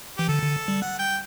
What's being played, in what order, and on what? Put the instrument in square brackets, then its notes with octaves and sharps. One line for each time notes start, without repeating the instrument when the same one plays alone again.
[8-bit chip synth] E3 [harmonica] G4
[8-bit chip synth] D3 [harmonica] A4
[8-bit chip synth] D3
G3
[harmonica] F#5
G5